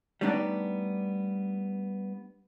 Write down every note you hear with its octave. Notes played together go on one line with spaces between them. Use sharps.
G3 A3 B3 D4 D#4 D5